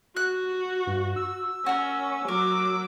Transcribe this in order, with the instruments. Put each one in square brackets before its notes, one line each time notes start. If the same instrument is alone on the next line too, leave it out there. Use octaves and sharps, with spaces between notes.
[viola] F#4 [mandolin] F#6
[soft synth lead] G2
E6
[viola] C#4 [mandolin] F#4 A#4
[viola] F#3 D6 [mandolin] A#4